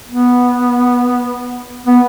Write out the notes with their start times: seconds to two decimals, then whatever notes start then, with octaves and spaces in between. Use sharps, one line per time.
0.08 B3
1.87 B3